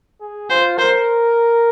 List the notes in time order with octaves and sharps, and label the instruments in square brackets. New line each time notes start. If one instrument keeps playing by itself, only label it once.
[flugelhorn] G#4
[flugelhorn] F4 [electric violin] C5
[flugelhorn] A#4 [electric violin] C5